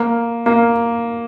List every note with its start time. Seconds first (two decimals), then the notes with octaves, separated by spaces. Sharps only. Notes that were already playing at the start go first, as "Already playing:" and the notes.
Already playing: A#3
0.46 A#3